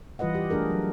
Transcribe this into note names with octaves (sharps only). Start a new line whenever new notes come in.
E3 G3 F4 B4 D#5 F#5
G4
A3 D4 G#4 A#4
F#3